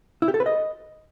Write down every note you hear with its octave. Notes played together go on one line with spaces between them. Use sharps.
E4
G4
A4
B4
D#5